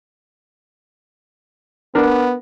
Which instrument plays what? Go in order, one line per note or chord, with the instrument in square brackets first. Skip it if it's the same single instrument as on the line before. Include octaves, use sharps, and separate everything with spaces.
[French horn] B3 [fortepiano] D4 A#4